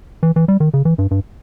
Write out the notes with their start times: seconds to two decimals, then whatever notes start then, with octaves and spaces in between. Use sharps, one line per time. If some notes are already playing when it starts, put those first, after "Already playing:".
0.23 E3
0.36 E3
0.48 G3
0.60 D#3
0.74 C#3
0.85 E3
0.98 G2
1.11 G2